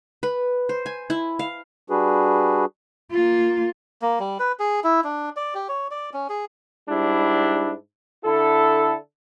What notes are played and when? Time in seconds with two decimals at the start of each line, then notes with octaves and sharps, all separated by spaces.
0.23 B4
0.69 C5
0.86 G#5
1.10 E4
1.39 F5
1.90 G3 D4 F#4 G#4 B4
3.12 A#3 F4
4.02 A#3
4.20 G3
4.40 B4
4.59 G#4
4.84 E4
5.04 D4
5.36 D5
5.55 G4
5.69 C#5
5.91 D5
6.14 C#4
6.29 G#4
6.89 G#2 G3 D4 E4
8.25 D3 E4 A4